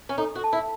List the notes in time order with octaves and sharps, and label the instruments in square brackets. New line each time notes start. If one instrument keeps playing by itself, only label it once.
[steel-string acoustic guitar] C#4
[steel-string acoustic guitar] D#4 [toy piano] A4
[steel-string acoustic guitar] F#4
[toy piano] A5
[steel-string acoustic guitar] E4